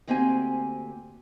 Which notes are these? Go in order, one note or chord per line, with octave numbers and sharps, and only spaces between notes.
D2 A#3 C4 G4 F5 G#5